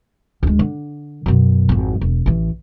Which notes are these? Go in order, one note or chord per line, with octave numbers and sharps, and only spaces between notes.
D2 G#3
D3
F#2 B2
G#1 F2
E1
A1 E3